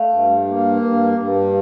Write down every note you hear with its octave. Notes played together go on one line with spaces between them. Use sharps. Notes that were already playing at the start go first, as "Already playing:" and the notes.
Already playing: A3 F5
G2
A#3
G2
G2